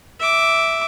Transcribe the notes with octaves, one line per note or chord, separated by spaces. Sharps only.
E5 D6